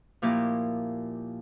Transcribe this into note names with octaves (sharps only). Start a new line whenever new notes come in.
A#2 F3 A#3 E4 G4